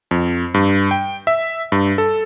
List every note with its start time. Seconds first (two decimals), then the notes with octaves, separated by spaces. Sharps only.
0.11 F2
0.54 G2
0.91 G5
1.27 E5
1.72 G2
1.98 A4